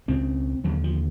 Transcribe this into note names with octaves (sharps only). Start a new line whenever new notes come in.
C#2 C#3 C4
D#2 D3 F#3
F3